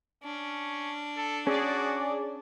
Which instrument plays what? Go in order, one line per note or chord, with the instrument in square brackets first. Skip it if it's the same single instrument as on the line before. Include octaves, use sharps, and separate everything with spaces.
[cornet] C#4 [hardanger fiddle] D4
[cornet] A4
[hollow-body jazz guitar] C#4 [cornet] F#4 [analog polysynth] G#4 D5